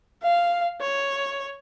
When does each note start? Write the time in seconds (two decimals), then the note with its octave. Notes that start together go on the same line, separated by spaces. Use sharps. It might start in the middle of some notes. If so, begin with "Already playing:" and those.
0.23 F5
0.81 C#5